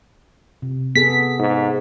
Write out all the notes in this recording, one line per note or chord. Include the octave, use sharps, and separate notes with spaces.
C3
B3 G#4 A4 B6
G#2